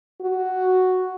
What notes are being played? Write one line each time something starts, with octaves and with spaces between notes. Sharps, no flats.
F#4